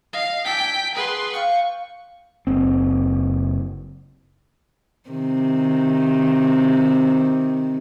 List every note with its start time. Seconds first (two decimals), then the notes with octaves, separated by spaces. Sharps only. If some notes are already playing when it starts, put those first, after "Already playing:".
0.13 D#5 F5
0.45 D4 G5 G#5 E6 B6
0.95 D4 G#4 B4 F#5 C6
1.34 F4 G5 C#6 F#6
2.47 F#1 C4
5.10 C3 D#3